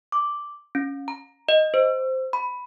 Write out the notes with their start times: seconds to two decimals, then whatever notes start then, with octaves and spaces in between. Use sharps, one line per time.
0.12 D6
0.75 C#4
1.08 A#5
1.49 D#5
1.74 C5
2.33 B5